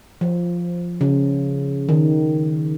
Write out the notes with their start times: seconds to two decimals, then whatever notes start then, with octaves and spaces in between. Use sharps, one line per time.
0.21 F3
1.01 C#3
1.89 D#3